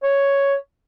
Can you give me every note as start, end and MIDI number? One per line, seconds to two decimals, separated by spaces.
0.03 0.55 73